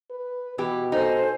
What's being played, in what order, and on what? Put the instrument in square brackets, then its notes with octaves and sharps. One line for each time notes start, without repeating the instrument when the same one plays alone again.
[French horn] B4
[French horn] B2 [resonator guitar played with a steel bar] E3 G4
[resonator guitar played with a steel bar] D#4 [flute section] A4 C5 G#5